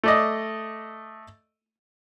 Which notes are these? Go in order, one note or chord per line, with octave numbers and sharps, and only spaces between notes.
A3 D5 D#5